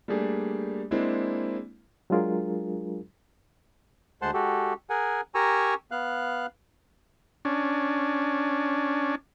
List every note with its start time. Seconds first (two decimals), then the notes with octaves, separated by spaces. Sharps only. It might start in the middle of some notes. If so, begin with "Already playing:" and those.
0.08 G3 A3 A#3 D4 G4 G#4
0.91 G#3 A#3 C4 D4 E4
2.10 F#3 G#3 D4 F4 G#4 A#4
4.22 D2 G#3 C5 F#5 A5 C6
4.34 G#3 F#4 G4 A4
4.90 G#4 A#4 F#5 G#5
5.35 G4 A#4 G#5 A#5 C#6 E6
5.91 B3 F5 F#6
7.45 C#4 D4